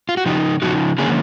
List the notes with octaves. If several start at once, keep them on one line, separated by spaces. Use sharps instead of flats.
F4
F#4
C#3 F3 D#4 G4
C#3 F3 G#3 B3 D#4 F#4
D3 F3 A#3 C#4 G#4